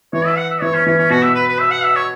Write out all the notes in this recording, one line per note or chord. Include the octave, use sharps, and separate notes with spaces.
E3 C#5
E5
F#5
E5
E3 C#5
C#4
E3 C#4
C#4
B2 F#4
E5
B4
B4
E5
F#5
E5
C#5